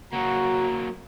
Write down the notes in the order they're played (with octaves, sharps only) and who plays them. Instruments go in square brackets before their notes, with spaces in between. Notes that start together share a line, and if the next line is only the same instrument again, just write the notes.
[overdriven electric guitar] F#3 A#3 [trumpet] F#4 [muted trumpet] A#5